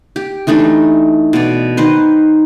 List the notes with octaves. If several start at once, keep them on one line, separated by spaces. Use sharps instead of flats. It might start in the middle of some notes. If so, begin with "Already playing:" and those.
G4
E3 A3 D4 D#4
B2 D5
D#3 B4 C5